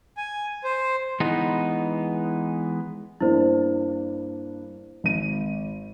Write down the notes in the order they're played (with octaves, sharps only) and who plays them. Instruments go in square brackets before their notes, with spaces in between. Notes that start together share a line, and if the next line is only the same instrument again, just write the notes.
[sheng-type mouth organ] G#5
C5
[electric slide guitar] E3 G#3 B3 D#4
[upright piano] G2 A#3 D4 [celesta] E4 C5
[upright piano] G#1 D#7